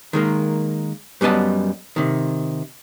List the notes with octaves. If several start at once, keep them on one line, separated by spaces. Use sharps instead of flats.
D#3 G#3 A#3
F#2 G3 B3 D#5 A5
C3 D#3